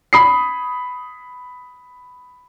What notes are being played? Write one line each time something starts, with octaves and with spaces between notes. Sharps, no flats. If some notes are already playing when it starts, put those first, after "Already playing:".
B5 D#6 C7